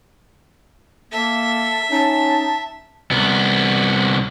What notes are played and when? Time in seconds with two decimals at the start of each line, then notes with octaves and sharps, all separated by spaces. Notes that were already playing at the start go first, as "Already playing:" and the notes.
1.11 A#3 A4 E5
1.91 C#4 D#4 A5
3.11 C2 B3